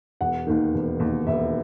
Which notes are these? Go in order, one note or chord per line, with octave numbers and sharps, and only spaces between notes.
E1 F#5
D#2 D#3
E1
D#2 D#3
E1 E5